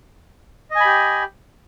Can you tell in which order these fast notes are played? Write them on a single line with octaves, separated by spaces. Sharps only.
D#5 G#5 B5 G4